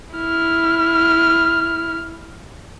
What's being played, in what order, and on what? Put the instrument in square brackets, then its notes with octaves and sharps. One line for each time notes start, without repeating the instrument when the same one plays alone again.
[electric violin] E4 F6